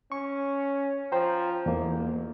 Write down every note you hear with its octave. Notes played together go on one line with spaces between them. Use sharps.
C#4 C#6
F3 C5 G5 A#5
F1 E2 A#3